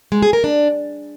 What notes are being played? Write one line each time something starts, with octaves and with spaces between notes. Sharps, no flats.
G#3
G#4
A#4
D4